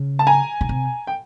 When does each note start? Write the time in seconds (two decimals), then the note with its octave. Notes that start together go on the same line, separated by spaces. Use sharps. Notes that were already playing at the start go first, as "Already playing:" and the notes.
Already playing: C#3
0.19 A5
0.27 G#5 A#5
0.61 C#3
0.69 C3
1.07 G5